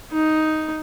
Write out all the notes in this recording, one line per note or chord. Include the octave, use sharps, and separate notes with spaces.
D#4